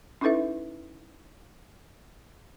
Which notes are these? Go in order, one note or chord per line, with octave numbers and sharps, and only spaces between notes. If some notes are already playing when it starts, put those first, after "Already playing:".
C#4 D#4 E4 A4 B4 E5